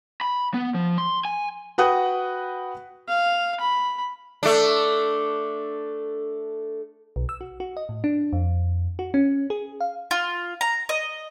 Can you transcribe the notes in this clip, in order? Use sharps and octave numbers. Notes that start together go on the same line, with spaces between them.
B5
B3
F3
C6
G#5
F#4 B4 F#5 G5 D#6 F#6
F5
B5
A3 D4
B1
E6
F#4
F#4
D#5
A2
D4
F2
F#4
C#4
G#4
F5
F4
A#5
D#5